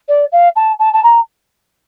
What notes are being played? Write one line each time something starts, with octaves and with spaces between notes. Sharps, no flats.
D5
F5
A5
A5
A5
A#5